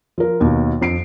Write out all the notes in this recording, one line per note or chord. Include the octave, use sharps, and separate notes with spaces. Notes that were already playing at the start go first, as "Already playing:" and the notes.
F3 A#4
D#2 B2
F2 C7 D7